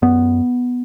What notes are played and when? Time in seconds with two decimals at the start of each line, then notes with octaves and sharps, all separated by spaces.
0.02 F#2 B3